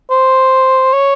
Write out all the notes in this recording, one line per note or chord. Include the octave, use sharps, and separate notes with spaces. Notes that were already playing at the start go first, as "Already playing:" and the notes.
C5
C#5